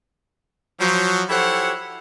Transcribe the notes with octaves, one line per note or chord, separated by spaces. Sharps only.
F3 F#3
E4 G4 A4 C5 C#5 F#5